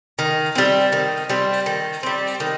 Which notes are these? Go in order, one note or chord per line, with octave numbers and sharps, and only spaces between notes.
D#3
G3 C4
D#3
G3 C4
D#3
G3 C4
D#3